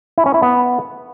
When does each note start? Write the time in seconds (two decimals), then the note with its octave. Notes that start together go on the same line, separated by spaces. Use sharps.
0.18 E4
0.26 C#4
0.34 E4
0.42 B3